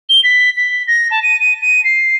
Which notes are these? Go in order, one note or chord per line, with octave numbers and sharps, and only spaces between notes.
G7
B6
B6
A#6
A5
D#7
D#7
D#7
C7